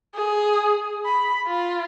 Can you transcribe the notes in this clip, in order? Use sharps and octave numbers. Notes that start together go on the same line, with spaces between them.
G#4
B5
F4